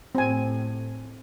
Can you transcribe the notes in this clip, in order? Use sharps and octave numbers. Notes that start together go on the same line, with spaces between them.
A2 C4 G#5